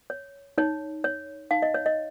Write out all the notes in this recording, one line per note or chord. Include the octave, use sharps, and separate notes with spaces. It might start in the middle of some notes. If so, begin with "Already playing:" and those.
C#5
D#4 C#5
C#5
D#4 F5
D#5
C#5
D#5